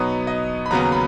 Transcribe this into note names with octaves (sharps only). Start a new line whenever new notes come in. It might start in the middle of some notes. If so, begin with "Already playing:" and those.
Already playing: B2 F#3 B3 D#4 C#5
D#5
B5
D#2 C#3 F#3 B3 A#5
B5